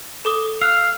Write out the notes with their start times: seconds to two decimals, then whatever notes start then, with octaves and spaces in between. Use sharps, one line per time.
0.25 A4 D6 D#6
0.61 F5 E6 F#6